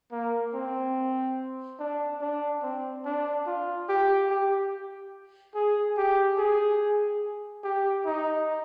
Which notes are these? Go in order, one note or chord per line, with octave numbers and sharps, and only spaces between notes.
A#3
C4
D4
D4
C4
D4
F4
G4
G4
G#4
G4
G#4
G4
D#4